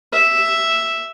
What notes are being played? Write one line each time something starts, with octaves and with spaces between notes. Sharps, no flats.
E5